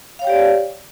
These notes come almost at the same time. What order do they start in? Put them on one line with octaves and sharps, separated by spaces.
F5 C#5 G5 G4 D5